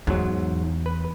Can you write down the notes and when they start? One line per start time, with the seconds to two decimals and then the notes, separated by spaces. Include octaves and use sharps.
0.07 E2 G#2 F#3
0.86 B4